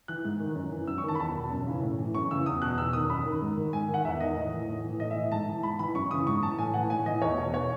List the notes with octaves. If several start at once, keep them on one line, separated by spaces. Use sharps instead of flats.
E3 F#6
G#2
D#3
F#2
E3
F#2 E6
C#6
D#3 A5
B5
E2 A5
B2
F#2
C#3 E3
A2
E3
F#2 C#6
C#3 E3 E6
E2 D#6
B2 F#6
E2 E6
D#3 D#6
F#2 B5
D#3
G#2
D#3
G#2 G#5
D#3
F#5
E2 E5
D#3 D#5
A2
E3
A2
E3
A2 D#5
E5
E3
G#2 A5
E3
G#2 B5
E3 B5
F#2 C#6
C#3 E3 D#6
G#2 C#6
E3 A5
A2 G#5
E3 F#5
A2 G#5
E3 D#5
E2 C#5
B2
C#5